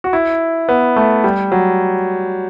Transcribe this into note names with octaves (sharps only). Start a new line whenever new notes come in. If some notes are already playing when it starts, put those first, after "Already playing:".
F#4
E4
B3
A3
G3
F#3